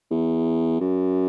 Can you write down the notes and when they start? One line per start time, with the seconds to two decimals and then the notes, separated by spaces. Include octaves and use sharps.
0.11 E2
0.80 F#2